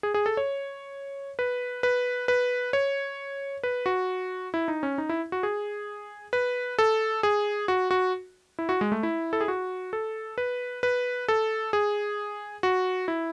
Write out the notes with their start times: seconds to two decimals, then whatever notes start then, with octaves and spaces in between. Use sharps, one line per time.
0.03 G#4
0.14 G#4
0.26 A4
0.37 C#5
1.39 B4
1.83 B4
2.28 B4
2.73 C#5
3.63 B4
3.86 F#4
4.54 E4
4.68 D#4
4.83 C#4
4.98 D#4
5.09 E4
5.32 F#4
5.43 G#4
6.33 B4
6.79 A4
7.23 G#4
7.68 F#4
7.91 F#4
8.59 E4
8.69 F#4
8.81 G#3
8.92 A3
9.03 E4
9.33 A4
9.41 G#4
9.48 F#4
9.93 A4
10.38 B4
10.83 B4
11.28 A4
11.73 G#4
12.63 F#4
13.08 E4